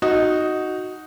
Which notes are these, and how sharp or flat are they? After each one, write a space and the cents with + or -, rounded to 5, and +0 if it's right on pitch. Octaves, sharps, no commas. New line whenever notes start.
D#4 +0 F#4 +0